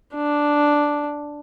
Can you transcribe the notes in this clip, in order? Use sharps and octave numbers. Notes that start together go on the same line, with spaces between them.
D4